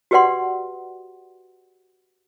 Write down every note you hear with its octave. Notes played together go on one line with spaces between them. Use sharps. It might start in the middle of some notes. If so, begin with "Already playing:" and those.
F#4 G4 B4 D5 F#5 C6